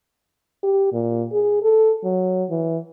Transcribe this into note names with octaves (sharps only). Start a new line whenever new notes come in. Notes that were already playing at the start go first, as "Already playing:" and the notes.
G4
A#2
G#4
A4
F#3
E3